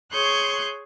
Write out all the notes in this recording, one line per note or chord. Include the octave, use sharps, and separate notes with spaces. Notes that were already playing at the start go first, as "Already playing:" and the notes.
G#4 C#5 C6 C#6 F#6 G6